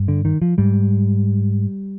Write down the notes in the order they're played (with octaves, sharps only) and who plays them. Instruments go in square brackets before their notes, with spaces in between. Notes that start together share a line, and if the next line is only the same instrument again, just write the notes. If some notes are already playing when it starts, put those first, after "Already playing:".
Already playing: [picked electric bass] G2
D3
D#3
F3
G#2 G3